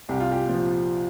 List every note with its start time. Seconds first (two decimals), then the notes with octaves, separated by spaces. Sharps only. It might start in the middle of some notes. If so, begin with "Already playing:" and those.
0.09 C2 G4
0.20 F4
0.32 G4
0.47 A#2 F3